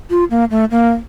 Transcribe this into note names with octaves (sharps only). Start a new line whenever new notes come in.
F4
A#3
A3
A#3